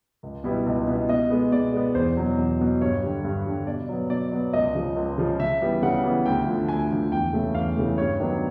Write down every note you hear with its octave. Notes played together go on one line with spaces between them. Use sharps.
C#2
B2 G3 B3 E4
C#2
B2 G3 B3 E4
B2 D#5
G#3 B3
B2 D5
G#3 B3
E2 C5
B2 F#3
E2
B2 F#3
G2 C#5
D3 G3
G2
D3 G3
B2 D5
F#3 B3
B2 D5
F#3 B3
C#2 D#5
C#3 F3
C#2
C#3 F3
C#3 E5
E3 G3 B3
C#3 F#5
E3 G3 B3
D2 G5
D3 F3
D2 G#5
D3 F3
E2 G5
C#3 E3 A3
E2 F5
C#3 E3 A3
G2 C#5
D#3 F#3 B3 D4